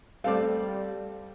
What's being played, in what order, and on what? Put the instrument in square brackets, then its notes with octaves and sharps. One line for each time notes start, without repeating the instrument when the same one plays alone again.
[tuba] G3 [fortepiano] A3 C4 A4 [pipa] D5 F5